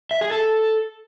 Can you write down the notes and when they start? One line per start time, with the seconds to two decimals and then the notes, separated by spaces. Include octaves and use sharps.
0.11 E5
0.21 G#4
0.31 A4